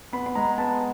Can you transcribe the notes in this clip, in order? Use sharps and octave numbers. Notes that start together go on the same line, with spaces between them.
B3 B5
B5
G#3 A#5
B3 A5